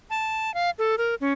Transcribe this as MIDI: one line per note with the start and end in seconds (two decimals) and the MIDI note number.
0.10 0.53 81
0.54 0.70 77
0.78 0.96 69
0.98 1.15 70
1.21 1.33 61